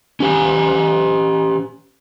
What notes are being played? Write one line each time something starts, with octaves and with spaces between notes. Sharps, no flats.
C#4 G4 G#5